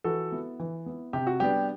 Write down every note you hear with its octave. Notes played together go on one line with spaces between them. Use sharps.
E3 F#4 A4
B3 E4
E3
B3 E4
C3 G4
F#4
G3 B3 D4 G4